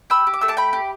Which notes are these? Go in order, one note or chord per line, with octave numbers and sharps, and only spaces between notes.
G4 B5 E6
G4
D6
A3 E6
A5 D6
G4 G5 B5
G4